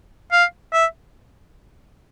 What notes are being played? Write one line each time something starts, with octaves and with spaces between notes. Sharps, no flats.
F5
E5